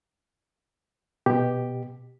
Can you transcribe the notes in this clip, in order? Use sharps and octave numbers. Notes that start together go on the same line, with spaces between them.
B2 G4